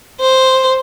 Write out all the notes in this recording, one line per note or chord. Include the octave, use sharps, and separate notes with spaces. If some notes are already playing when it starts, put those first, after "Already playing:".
C5